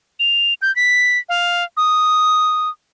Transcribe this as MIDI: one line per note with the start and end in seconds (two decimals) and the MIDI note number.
0.20 0.54 101
0.62 0.74 91
0.76 1.18 95
1.29 1.64 77
1.77 2.69 87